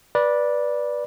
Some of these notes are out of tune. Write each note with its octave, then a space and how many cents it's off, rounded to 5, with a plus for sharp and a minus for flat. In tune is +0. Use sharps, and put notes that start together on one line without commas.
B4 -20 D5 +0